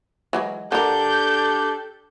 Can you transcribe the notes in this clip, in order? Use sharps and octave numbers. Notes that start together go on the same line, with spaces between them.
E3 F#3 G#3
D3 D4 G4 A4 A#4 G6